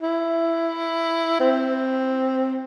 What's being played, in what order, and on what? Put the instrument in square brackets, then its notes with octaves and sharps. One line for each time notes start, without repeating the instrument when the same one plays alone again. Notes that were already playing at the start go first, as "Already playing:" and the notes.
[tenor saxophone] E4
C4